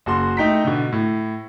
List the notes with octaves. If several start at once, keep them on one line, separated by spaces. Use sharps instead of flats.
F#1 F#4 C6
A3 D#4 G5 A#5 B6
B2 D3
A2